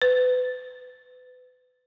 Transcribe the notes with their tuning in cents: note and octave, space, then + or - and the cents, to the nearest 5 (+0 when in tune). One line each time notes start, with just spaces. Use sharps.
B4 +30